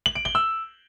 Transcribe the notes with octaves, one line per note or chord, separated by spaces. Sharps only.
F#7
D7
G7
E6